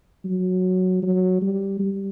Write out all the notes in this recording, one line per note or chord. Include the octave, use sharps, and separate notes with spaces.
F#3
F#3
G3
G3